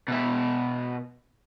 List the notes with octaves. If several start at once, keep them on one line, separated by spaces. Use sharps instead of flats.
B2 E5